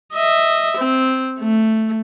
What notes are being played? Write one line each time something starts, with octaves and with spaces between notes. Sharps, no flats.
D#5 E5
C4
A3